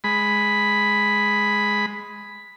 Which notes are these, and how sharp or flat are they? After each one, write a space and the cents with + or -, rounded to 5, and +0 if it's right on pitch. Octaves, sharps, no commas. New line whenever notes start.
G#3 +0 B5 +0